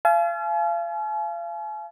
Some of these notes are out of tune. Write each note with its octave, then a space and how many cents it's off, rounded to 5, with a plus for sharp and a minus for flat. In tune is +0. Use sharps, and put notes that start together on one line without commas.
F5 -35 G#5 +45